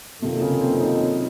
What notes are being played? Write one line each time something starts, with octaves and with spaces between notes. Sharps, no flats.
F#2 C3 D#3 A#3 F4 A4
C#3
C4
D#4